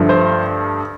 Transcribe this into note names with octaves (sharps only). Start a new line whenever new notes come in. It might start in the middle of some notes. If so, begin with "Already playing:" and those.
Already playing: G2 D3 F3 A3
C5